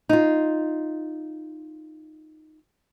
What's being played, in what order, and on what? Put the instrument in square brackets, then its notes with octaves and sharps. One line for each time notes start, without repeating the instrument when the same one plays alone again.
[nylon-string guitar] D#4 F4